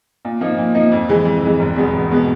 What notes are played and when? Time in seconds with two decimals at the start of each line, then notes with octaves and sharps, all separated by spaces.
0.25 A#2
0.41 F3 A#3 D#4
0.58 A#2
0.75 F3 A#3 D#4
0.92 F2
1.09 C3 E3 G#3
1.25 F2
1.42 C3 E3 G#3
1.60 E1
1.76 E2 B2 G#3 B3
1.93 E1
2.11 B2 G#3 B3